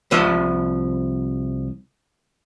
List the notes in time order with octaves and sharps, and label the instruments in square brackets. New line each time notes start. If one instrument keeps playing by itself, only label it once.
[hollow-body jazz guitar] C2 F3 D#5 E5